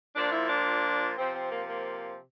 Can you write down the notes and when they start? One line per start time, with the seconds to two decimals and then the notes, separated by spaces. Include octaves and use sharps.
0.15 A#2 F3 D4
0.32 E4
0.49 D4
1.17 C3 F3 C4
1.35 C4
1.52 A#3
1.69 A#3